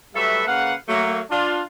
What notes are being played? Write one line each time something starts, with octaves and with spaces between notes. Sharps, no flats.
F#3 G3 A3 A4 B4 E5
C#3 A#3 B4 F5 F#5
F#3 A3 A#3
D4 F4